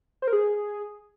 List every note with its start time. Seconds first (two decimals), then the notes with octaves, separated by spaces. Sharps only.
0.22 C5
0.27 A#4
0.33 G#4